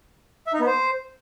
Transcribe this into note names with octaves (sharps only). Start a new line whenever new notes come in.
E5
D#4
B3
C5